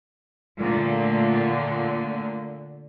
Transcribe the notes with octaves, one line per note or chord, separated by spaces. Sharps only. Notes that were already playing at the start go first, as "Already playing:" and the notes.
A#2 D3 A3